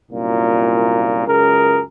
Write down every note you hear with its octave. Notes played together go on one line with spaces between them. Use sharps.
C2 F#2 A#2
C#2 F#2 G#4 A#4